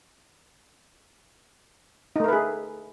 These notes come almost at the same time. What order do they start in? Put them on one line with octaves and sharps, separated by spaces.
D#4 A3 A#4 B4 G#4